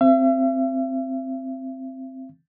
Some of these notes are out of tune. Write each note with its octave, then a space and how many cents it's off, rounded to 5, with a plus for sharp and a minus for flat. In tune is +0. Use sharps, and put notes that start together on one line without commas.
C4 +0 E5 +45